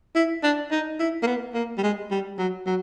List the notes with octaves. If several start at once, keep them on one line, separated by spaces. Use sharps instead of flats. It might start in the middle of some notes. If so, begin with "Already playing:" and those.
E4
D4
D#4
E4
A#3
B3
A#3
G3
G#3
G3
F#3
F#3